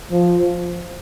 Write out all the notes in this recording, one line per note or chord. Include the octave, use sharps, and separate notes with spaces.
F3